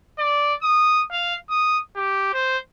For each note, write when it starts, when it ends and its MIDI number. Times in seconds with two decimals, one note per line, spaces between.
0.18 0.54 74
0.63 1.02 87
1.11 1.35 77
1.50 1.79 87
1.96 2.31 67
2.33 2.58 72